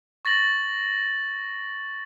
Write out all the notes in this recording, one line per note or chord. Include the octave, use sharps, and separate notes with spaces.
C#6 A6 A#6 F#7